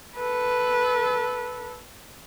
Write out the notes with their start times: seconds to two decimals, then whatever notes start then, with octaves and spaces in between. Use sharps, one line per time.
0.16 A4 B4